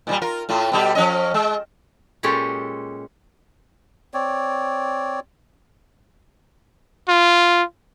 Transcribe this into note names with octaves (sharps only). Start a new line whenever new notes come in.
A#2 D#3 G3
F4 A#4
A2 A3 F4
B2 G3 G4
F3 C#4 D#5
G#3
A#2 G#3 C#4 G4 A4
C4 C#5 D5
F4